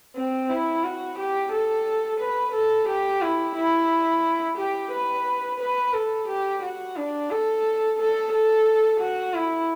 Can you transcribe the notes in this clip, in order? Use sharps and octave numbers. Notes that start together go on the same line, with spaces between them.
C4
E4
F#4
G4
A4
B4
A4
G4
E4
E4
G4
B4
B4
A4
G4
F#4
D4
A4
A4
A4
F#4
E4